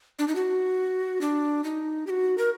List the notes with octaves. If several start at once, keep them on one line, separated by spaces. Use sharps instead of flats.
D4
D#4
F#4
D4
D#4
G4
F#4
A#4